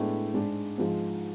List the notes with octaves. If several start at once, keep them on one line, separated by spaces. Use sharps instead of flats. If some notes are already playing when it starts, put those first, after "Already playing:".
Already playing: A2 G#3 B3 D4
G#2 G#3 D4
G#2 F3 G#3